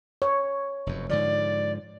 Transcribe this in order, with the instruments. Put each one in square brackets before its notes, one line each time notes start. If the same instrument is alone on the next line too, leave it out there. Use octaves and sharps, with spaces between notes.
[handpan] C#5
[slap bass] F1 F#2
[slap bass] G#2 D3 F3 [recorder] D5